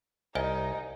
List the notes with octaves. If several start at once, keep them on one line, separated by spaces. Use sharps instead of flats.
C2 D#4 C5 D#5 G#5